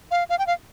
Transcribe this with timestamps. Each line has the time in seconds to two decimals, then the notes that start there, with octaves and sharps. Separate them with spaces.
0.11 F5
0.29 F5
0.39 G5
0.47 F5